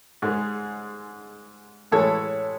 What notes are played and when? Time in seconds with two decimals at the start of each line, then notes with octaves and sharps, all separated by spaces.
0.22 G#2 G#3
1.92 A2 E3 G#3 A4 C#5